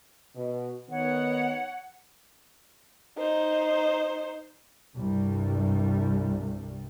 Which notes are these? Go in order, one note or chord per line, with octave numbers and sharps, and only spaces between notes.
B2
D#3 B3 C#5 F#5
D#4 C5
C2 G2 G3